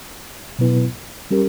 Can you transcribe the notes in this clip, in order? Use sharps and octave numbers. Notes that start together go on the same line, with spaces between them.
B2 F#3 B3 E4 B4
G3 C#4 G4 A#4